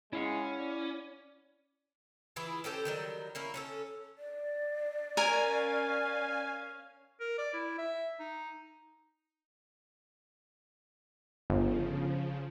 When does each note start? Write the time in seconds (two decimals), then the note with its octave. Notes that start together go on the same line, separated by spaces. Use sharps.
0.13 G#3 C#4 E4 F5 F#5
0.60 D5
2.36 E3 E4 F4 G#4
2.64 C#4 G4 A4 C5
2.85 D#3 F#3 G3
3.35 A#3 C#4 E4
3.54 C#4 F#4 A4
4.18 D5
5.17 C#4 A#4 F5 G#5
7.20 A#4
7.38 D5
7.54 E4
7.78 E5
8.20 D#4
11.50 G1 C#3 F3